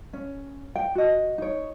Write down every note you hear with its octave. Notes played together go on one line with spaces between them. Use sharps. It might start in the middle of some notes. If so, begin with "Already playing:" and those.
C#4
G5
F#4 D#5
D#4 C#5